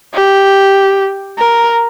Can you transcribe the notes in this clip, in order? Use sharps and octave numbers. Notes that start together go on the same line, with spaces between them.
G4
A#4